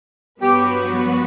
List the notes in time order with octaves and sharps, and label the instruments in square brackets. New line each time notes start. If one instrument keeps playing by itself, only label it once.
[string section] G2 F#3 B3 F#4 B4 [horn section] G4